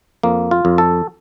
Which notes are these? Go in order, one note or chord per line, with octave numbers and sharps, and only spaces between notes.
F2 A#3
F4
F2
A4